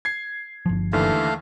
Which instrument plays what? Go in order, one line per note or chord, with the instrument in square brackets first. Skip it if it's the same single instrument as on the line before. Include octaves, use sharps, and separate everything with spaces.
[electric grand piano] G#6 C7
[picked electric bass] G1 F3
[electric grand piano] D#2 D3 E3 [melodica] A3 F5